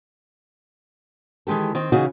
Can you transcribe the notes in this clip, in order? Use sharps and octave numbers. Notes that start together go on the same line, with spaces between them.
D#3 E3 G#3 G4 A4
D#3 C4
C#3 E3 D#4 F#4 G#4 D#5